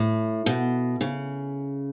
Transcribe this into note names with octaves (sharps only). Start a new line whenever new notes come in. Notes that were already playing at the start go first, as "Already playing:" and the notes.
Already playing: A2
B2
C#3